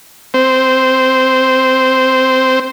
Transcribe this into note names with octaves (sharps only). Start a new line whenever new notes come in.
C4 C5